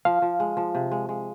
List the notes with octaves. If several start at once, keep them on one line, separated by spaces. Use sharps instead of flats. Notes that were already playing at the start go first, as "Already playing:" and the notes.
F3 F5
F3
G#3
F3
C3
G#3
G#3